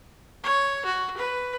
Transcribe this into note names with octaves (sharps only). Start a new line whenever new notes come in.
C#5
F#4
B4